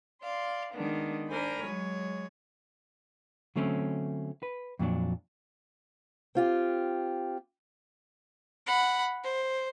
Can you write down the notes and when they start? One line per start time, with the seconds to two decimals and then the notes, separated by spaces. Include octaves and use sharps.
0.22 D5 F5 C6
0.73 D#3 G#3 A#3 B3 D4
1.29 D4 A#4 C5 G#5 B5
1.63 F#3 G#3 C#5
3.56 D3 F#3 A3 C4 C#4
4.43 B4
4.79 F2 A#2 F#3 D4
6.35 C4 F4 G4
8.67 F#5 B5
9.24 C5